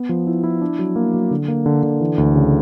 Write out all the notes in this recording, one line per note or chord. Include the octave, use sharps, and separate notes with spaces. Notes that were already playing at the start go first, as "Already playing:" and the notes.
Already playing: B3
F3
E4
E4
D4
F#3
A#3
F#3
D3
A#3
D3
D3
E3
D2
C#3